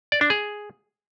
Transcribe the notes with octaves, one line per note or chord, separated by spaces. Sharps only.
D5
D4
G#4